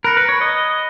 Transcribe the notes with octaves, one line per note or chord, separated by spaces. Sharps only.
A#4 B5 F#6 A#6 C#7
B4
C#5
D#5